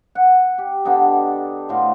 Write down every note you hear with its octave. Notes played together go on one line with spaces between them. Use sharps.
F#5
G4
D3 B3 D4 D#4
A2 F#4 C5 F5